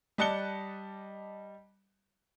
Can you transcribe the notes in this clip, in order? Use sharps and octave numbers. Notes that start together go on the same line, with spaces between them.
G3 D#5 A5 F#6 C#7 G7